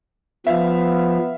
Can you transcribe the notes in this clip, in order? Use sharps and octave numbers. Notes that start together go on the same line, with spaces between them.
F3 B3 E5 F5